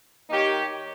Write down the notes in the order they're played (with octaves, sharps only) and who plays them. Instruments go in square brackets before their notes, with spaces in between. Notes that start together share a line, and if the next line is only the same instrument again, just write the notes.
[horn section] D#3 A#3 D#4 G4 C#5